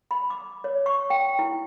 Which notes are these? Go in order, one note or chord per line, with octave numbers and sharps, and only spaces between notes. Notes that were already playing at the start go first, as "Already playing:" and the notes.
B5
D6
C#5
C#6
G5
E4